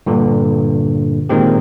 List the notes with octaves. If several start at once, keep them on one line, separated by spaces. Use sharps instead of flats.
G2 A#2 D3
A#2 D#3 G#3 C4 G4